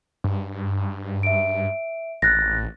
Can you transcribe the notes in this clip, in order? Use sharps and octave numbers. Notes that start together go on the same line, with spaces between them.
G2
E5 D7
A1 F#6 A6 A#6